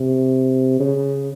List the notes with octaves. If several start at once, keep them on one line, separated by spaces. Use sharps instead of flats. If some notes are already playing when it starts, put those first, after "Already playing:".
Already playing: C3
C#3